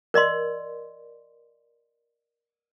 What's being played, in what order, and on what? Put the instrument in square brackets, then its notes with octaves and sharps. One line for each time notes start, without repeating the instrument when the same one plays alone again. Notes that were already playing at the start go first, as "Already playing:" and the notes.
[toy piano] A#4 D5 D#5 C6